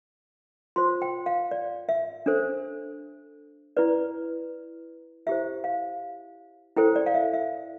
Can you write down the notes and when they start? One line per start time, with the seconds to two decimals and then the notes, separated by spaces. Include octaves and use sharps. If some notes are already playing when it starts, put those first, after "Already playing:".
0.76 F4 C5 C6
1.02 G5
1.26 F5
1.51 D5
1.89 E5
2.26 D4 A4 C5
3.77 E4 B4 D5
5.27 E4 G4 C5 E5
5.64 F5
6.77 E4 A4 C5 G5
6.96 D5
7.06 F5
7.14 E5
7.33 E5